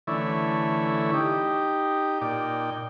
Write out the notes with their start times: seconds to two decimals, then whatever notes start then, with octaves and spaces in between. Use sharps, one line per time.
0.07 D3 E3 A3 C#4 E4
1.14 D#4 G4
2.21 A#2 D#4 D5 G5